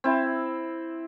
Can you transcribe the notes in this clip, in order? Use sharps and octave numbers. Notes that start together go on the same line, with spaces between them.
C4 E4